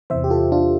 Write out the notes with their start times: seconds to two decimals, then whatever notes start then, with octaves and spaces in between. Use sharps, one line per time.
0.10 E2 C3 E3 C5 E5
0.24 G4
0.30 F4 A4
0.52 D4 F4